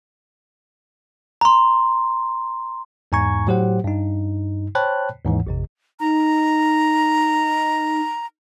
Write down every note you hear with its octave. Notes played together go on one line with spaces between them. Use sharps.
A#5 C6
E2 G#2 G#5 A#5 C#6 G#6
A2 F#3 G4 C5 F#5
G2 D#4
C5 C#5 G5 A5 B5 F#6
D#2 G#2 E3
A1 F2 C3
D#4 A#5